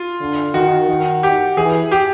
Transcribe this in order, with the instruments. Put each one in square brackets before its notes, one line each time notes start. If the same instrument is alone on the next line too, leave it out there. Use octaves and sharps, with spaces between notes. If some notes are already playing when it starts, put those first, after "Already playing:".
Already playing: [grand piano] F4
[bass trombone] D3
[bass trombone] D#3 [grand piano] F#4
[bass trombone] D#3
[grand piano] G4
[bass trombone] E3 [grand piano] G#4
[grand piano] G4